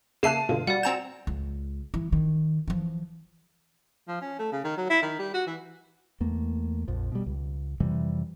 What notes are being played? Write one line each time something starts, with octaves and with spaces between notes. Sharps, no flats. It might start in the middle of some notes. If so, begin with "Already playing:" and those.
C#3 A#3 E5 A5 F#6 C7 D#7 E7
G2 B2 D3 F4
G3 F#4 D5 F#5
C4 G#5 A#5 G6 E7
C#2
E3
D#3
E3 F3
F3
C#4
A3
C#3
D#3
F#3
E4
D#3
G3
F#4
E3
E2 A3 A#3
A#1 F2 F3
B2 G3
C#2
F2 C3 E3 G3